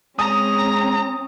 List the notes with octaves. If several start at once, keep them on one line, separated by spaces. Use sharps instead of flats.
G#3 C4 C#4 A#5 D#6